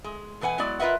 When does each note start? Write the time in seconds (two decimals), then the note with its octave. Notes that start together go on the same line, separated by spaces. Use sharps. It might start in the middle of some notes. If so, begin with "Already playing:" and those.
0.04 G#3
0.41 B2 E3 B4 F#5 G#5
0.58 F#3 G#3 B3 E4 D5
0.79 F4 A#4 B4 D#5 E5 F#5